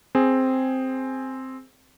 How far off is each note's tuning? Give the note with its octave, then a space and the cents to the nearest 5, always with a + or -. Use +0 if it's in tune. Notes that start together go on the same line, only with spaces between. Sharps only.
C4 +0 G#4 +0